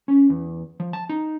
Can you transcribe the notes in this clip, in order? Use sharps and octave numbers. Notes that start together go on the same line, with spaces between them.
C#4
E2
F3
A5
D#4